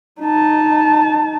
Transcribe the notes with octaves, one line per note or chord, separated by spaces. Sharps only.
D#4 A5